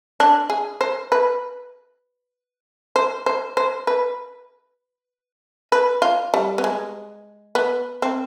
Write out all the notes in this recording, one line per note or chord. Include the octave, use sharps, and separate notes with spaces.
D4
G#4
C5
B4
C5
C5
C5
B4
B4
F4
G3
B3
G#3
B3
C4